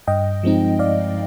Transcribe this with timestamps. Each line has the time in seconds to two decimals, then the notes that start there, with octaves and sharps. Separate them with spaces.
0.07 G2 D#5 G5
0.43 F3 G#3 C4 D#4
0.79 G2 D5 F5